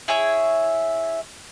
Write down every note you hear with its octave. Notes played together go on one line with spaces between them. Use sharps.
E4 G#4 C#5 E5